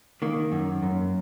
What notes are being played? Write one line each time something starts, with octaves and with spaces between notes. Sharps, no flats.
D#3 A#3
F#2
F#2